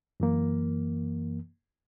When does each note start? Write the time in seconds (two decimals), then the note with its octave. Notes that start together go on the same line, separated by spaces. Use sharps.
0.20 F#2 E3 A#3